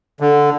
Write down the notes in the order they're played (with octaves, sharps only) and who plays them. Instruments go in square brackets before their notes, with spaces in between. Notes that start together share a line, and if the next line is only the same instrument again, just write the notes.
[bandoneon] D3